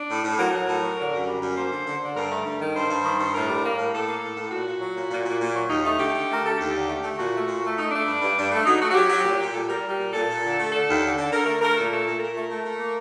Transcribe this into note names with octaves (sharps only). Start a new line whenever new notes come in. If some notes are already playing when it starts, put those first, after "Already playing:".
Already playing: D4
A2
A2
F#3 A#4
F#3
A2
F#3
D3
F#2
G3
F#2
A#3 C5
D3
D3
D3
G2 A#4
A3
G2
D#3
G2 C5
G2
D#3
G2
A2 A#4
G3
A#3
A2
A2 A4
A#3
A2
A2
A#2 F#4
A#2
F#3
A#2
A#2
A#2
A#2
F#3
D#2 D#4
A3 D#4
D3 G4
D3
A3 A#4
A3 A4
D#2 G4
D3
A3
A3
A#2 F#4
A3
A#2
A3
A3 D#4
A3 D4
G2
G2
G2
A3
F#3 D#4
A3 F#4
F#4
F#3 G4
F#3
A#2
A#2
G3 A4
G3 A#4
G3
A#2
A#2 A4
A#2
D3
A3
D3 A4
D#2
D3
D3
D3 A#4
A3 A#4
A3 A#4
A#2 A4
A3 A4
A#2
A#2 A#4
A3
A3
A3
A#3